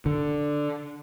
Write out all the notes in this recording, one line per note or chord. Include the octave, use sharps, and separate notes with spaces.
D3